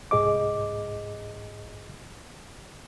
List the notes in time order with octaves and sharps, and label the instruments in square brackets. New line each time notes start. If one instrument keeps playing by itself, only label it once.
[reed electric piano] C2 G#2 G#4 D#5 D6